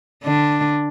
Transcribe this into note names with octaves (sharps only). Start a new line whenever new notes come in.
D3 D4